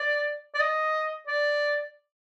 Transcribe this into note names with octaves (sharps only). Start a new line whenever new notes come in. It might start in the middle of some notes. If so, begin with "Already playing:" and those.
Already playing: D5
D5
D#5
D5